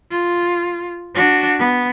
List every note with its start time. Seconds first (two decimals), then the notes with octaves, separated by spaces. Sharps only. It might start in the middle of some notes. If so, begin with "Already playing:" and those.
0.11 F4
1.15 D4 F#4
1.59 B3